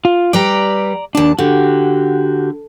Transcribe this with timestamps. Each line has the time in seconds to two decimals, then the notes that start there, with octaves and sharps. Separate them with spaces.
0.05 F4
0.33 G3 B4 D5 G5 A#5
1.15 D#2 D4 A5
1.39 D3 F#4 G4